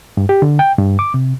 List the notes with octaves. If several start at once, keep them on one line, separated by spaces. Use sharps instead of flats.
G2
G4
D3
G5
G2
D6
C3